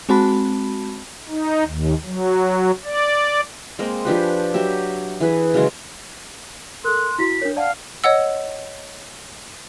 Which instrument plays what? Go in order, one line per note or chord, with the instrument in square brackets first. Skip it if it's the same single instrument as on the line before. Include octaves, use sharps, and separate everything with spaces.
[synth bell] G#3 C4 F#4 A5 B5
[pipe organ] D#4
D#2
F#3
D5
[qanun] G#3 A#3 C4 D#5
F3 D4 G4 B4
F#3 G4 E5
E3 G#4 B4
C#3 F#3 G#3
[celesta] A4 A#4 [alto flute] C6 [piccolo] F#6
[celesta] E4 F#4 [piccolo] B6
[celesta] D4 C#5 [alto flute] A#4
[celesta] D5 A5 [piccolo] F5 [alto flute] F#5
[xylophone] C#5 D#5 F#5 E6